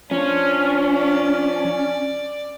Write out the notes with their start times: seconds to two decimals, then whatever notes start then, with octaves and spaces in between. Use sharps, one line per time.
0.11 F3 C#4 D4 F4
0.94 D5